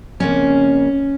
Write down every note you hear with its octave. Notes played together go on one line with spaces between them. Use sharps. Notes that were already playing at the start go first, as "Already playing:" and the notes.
F2 C#3 A#3 C#4